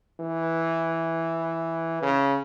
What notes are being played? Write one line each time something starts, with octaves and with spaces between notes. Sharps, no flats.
E3
C#3